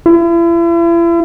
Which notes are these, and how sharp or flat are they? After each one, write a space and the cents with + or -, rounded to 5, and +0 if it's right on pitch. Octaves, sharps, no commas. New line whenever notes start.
E4 +40